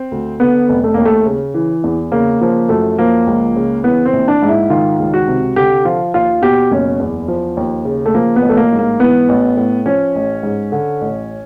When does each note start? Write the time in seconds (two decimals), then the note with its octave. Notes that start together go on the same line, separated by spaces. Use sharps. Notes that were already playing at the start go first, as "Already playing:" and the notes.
Already playing: C4
0.12 D2
0.40 D3 B3
0.69 F1
0.84 A3
0.94 D#2 A#3
1.05 A3
1.26 C#3
1.54 E3
1.84 E2
2.12 C#3 A#3
2.41 F3 A#3
2.69 F#2 A3
2.99 F3 A#3
3.27 C#2
3.56 C#3
3.84 E3 B3
4.06 C4
4.13 A#1
4.28 D4
4.42 G#2
4.49 E4
4.70 D#3 F4
4.99 C#2
5.14 F#4
5.27 C3
5.56 D3 G4
5.85 F3 F4
6.14 D#2 F4
6.42 B2 G4
6.71 F#1 C#4
7.00 E2
7.28 F3
7.57 D#2
7.85 C#3
8.06 A3
8.14 F3 A#3
8.36 B3
8.42 A1
8.49 A3
8.57 A#3
8.72 G#2
8.79 A#3
9.00 E3 B3
9.29 A1
9.57 A2
9.86 F3 C#4
10.16 A1
10.43 G#2
10.72 D3
11.01 A1